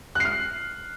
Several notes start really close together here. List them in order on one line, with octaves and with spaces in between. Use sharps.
F#6 C7 F6